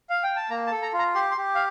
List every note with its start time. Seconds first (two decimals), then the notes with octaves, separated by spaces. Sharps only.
0.10 F5
0.23 G5
0.36 A5
0.50 A#3 A#5
0.67 A5
0.72 A4
0.83 A#5
0.93 F4
0.99 A#5
1.15 G4 C6
1.31 C6
1.37 G4
1.55 F5